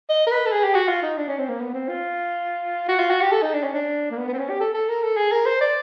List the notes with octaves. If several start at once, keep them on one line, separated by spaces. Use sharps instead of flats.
D#5
A#4
B4
A4
G#4
G4
F#4
F4
D#4
D4
C#4
C4
A#3
B3
C4
F4
F#4
F4
F#4
G4
A4
D#4
D4
C#4
D4
A#3
B3
B3
C4
C#4
G4
A4
A4
A#4
A4
G#4
A#4
C5
D5